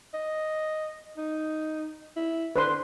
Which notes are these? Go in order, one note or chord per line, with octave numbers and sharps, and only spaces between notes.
D#5
D#4
E4
D3 B4 C5 C6